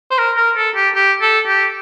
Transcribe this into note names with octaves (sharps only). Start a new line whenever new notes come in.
C5
A#4
A#4
A4
G4
G4
A4
G4